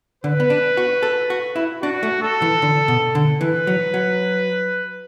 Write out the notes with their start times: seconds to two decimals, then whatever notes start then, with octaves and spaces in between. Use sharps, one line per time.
0.24 D3 B4
0.40 B3
0.50 D4
0.77 F#4
1.03 A4
1.30 F#4
1.56 E4
1.82 D4 F#4
2.03 A3
2.22 A4
2.42 E3
2.62 D3
2.88 B2
3.15 D3
3.41 E3 B4
3.67 F#3
3.94 F#3